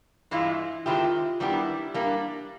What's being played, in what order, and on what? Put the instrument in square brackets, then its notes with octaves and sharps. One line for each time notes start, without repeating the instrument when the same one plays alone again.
[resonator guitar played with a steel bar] G2 E3 G#3 F4 [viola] E4
[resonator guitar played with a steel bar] D#3 G#3 C4 E4 G4 [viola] F4
[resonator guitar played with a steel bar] D#3 G3 B3 D4 G4 [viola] E4
[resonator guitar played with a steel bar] G3 A#3 D4